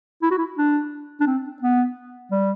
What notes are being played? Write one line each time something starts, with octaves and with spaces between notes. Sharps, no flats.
E4
F#4
E4
D4
D4
C4
B3
G3